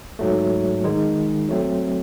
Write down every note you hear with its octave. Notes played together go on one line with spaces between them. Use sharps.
G#2 F#3 A3
D#3 G#3 D#4
F#3 A3 C4